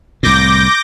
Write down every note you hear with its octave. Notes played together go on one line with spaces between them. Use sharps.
C2 A2 D6 G6 A#6